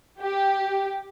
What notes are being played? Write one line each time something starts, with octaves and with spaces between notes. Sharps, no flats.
G4